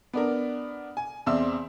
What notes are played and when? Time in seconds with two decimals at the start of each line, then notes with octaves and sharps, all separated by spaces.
0.14 B3 D4 A#4
0.97 G#5
1.26 E2 C4 D5 E5 C6 E6